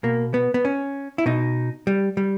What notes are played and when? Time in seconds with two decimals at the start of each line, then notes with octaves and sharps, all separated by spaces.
0.03 B2 A#3
0.34 B3
0.54 B3
0.65 C#4
1.18 E4
1.26 B2 D#4
1.87 G3
2.17 G3